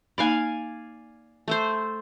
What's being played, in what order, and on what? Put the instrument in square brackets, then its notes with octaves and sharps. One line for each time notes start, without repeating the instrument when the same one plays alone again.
[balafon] A#3 D#4 B5 [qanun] D5 F5 G#5
[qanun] A3 A4 C5